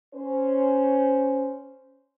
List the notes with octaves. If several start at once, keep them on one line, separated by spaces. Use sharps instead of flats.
C#4 C5